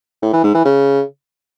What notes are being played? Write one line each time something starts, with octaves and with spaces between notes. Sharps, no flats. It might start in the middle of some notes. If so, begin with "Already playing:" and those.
A2
E3
G#2
E3
C#3